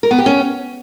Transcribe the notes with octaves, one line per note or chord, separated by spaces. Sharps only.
A#4
B3
G4
C#4